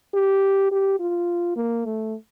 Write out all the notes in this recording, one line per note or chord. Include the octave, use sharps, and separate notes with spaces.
G4
G4
F4
A#3
A3